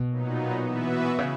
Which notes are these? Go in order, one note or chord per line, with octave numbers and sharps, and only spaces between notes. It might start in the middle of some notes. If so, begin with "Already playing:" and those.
Already playing: B2
A#2 F#3 B3 D#4
E3 B3 F#4 B4 E5
C#3